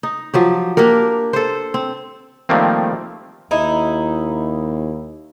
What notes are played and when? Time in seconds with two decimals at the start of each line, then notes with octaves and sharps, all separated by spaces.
0.03 D#4
0.34 F3 F#3 G4
0.77 A#3 D4 G4 A#4
1.33 A4 C5
1.74 C4
2.49 D#3 F3 G3 A3 A#3 C4
3.51 D#2 D#4 E4